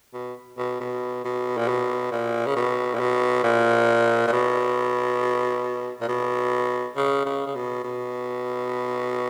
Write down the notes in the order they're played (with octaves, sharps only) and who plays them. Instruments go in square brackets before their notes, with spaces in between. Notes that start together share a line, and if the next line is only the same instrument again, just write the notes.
[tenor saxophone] B2
B2
B2
B2
A#2
B2
A#2
C#3
B2
A#2
B2
A#2
A#2
B2
A#2
B2
C#3
C#3
C#3
B2
B2